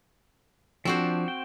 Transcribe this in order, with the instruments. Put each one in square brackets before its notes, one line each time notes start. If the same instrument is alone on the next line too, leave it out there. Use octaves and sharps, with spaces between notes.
[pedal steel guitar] F3 D4 [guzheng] C4 F#4 C5
[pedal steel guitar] G5